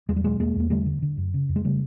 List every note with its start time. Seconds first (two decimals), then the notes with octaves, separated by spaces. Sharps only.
0.09 E2 G#3
0.16 G3
0.24 B2 F#3 G#3
0.39 E2 G#3 A#3
0.56 E2 A#3
0.70 D3 G3 A3
0.86 D3
1.02 D3
1.17 F#2
1.34 C#3
1.49 F2
1.56 G#3
1.65 C#3 G3 A3